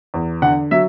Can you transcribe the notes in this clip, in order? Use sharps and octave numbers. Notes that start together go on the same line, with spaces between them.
E2
D3 F#5
F#3 E5